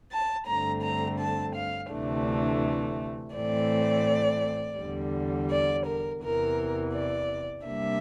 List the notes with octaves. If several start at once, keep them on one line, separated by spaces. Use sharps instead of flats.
A5
G2 D3 A3 C4 A#5
A#5
A5
F5
D2 C3 E3 A3 D4
A2 E3 A3 C4 D5
E2 D3 G3
D5
A#4
E2 C3 E3 A#4
D5
C3 G3 A#3 D4 E5